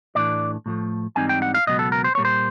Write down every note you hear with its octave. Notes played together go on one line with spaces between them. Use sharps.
A2 E3 A3 D4 D5
A2 F3 A3
G#2 E3 G3 C4 D#4 G#5
G5
F#5
F5
C#2 B2 F#3 B3 D#5
A4
A#4
C5
A#2 G3 A#3 C#5
C5